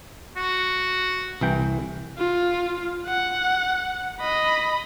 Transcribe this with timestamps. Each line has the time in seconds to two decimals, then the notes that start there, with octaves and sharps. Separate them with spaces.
0.37 F#4
1.41 C2 E3 G5
2.18 F4
3.06 F#5
4.21 D#5 B5